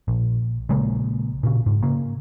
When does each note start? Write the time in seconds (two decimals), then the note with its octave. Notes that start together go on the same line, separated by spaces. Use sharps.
0.08 A#1
0.69 A#1 C#3 G#3 A#3
1.43 A#2 C#3
1.66 G#2
1.83 C#3 A#3